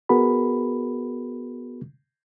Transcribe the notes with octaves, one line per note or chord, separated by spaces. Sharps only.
B3 F#4 G#4 A#4 B5